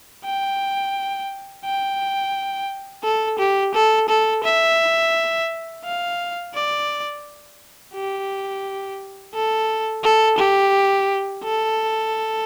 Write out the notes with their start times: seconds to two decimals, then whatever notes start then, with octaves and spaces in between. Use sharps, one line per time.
0.25 G5
1.65 G5
3.04 A4
3.39 G4
3.74 A4
4.08 A4
4.44 E5
5.84 F5
6.54 D5
7.94 G4
9.34 A4
10.03 A4
10.38 G4
11.44 A4